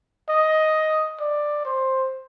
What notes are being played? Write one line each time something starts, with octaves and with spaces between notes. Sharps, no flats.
D#5
D5
C5